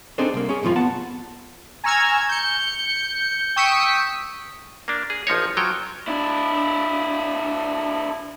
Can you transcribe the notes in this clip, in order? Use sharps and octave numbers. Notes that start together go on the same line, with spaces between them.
C4 D4 D#4 G#4 A4 C5
C2 A#3
C#4 G#4
F#2 A2 C3 F3 F4
B3 F#5 A5
G#5 A#5 C#6 E6 F6 G#6
G6 C#7
G5 C#6 D#6 E6 B6 C#7
A#3 D4
G#4
A1 F3 D#4 C#5
F3 F#3 C#5 G5
D4 E4